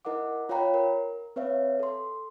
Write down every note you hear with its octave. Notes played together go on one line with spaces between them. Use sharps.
D#4 E4 A#4 D#5 F#5 D6
F4 C#5 F5 G5 A#5 B5
A#4
C4 B4 C#5 E5 F5
A4 C6